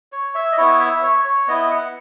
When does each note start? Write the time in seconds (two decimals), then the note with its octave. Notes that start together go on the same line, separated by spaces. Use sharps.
0.12 C#5
0.35 E5
0.52 D#5
0.57 B3 E4 C#5
0.80 E5
1.02 C#5
1.25 C#5
1.47 B3 E4 D#5
1.71 F#5